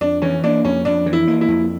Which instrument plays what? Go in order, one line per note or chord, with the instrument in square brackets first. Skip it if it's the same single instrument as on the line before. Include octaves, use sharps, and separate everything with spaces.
[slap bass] F2 [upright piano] D4
[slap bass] E3 [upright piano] C#4
[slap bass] A#3 [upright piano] D4
[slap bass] F2 [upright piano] C#4
[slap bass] F2 [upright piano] D4
[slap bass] E3
[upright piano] E4
[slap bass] A#3
[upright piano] E4
[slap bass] F2